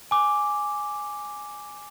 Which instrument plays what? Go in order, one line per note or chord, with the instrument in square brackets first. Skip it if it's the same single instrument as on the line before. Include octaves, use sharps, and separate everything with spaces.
[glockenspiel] G#5 D6